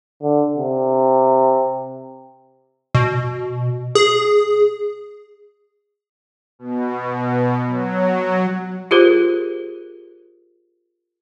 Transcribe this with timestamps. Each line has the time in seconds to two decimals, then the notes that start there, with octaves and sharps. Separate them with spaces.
0.22 D3
0.57 C3
2.95 B2
3.95 G#4
6.59 B2
7.68 F#3
8.91 F4 G4 G#4 A#4 C5